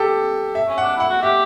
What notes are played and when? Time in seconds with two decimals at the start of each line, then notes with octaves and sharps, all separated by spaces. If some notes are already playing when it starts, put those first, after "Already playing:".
Already playing: G4 A4
0.55 E5
0.68 C#4
0.78 D4 F#5
0.96 E4 F#5
1.09 F#4
1.22 G4 E5